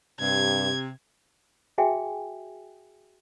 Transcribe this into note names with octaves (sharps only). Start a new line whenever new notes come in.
G2 C3 G#6
F#4 G#4 E5 G5 G#5